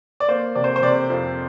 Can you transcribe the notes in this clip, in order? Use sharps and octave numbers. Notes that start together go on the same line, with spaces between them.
D5
A#3 C5
C3 D5
C5
C5
C3 D5
F2